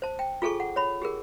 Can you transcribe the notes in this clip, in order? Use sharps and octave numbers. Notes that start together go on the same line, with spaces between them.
C5 A5
G5
F4 G#4 A4 G#5 C#6
F#5
C#5 B5
G4 G#4 A#4